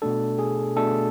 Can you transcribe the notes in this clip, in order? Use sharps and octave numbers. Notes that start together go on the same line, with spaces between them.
B2 A3 D4 A4
G#4
B2 A3 D4 A4